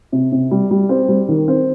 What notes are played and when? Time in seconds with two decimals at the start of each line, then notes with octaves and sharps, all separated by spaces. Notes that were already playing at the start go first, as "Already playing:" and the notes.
0.12 C3
0.32 C3
0.51 G3
0.71 G3
0.89 C4
1.08 G3
1.29 D#3
1.48 C4